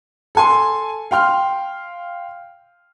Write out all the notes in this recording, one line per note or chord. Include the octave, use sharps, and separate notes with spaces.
A4 G#5 C6
F5 G5 C6 F6